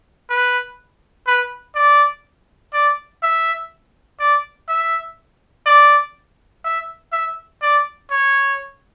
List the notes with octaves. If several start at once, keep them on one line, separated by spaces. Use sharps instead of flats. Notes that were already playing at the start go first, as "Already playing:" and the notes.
B4
B4
D5
D5
E5
D5
E5
D5
E5
E5
D5
C#5